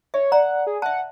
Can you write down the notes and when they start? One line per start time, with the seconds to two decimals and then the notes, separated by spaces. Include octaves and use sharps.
0.14 C#5 E5
0.32 D5 F#5 A#5
0.67 G#4
0.82 E5 F#5 A5